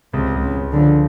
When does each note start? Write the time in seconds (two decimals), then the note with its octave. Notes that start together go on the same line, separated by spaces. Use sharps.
0.13 C#2 C3
0.35 C#2
0.43 C#3
0.57 C#2
0.71 D3
0.78 F3